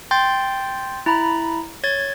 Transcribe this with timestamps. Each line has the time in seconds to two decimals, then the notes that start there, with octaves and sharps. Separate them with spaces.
0.11 G5 C6 G6 A6
1.06 E4 A#5 B5
1.84 C#5 G#6 A6